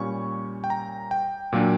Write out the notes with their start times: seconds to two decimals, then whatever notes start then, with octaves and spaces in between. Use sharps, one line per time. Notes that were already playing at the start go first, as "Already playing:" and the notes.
Already playing: A#2 G3 C#4 C#6
0.64 G5
0.70 A#5
1.11 G5
1.53 A#2 F#3 A#3 D4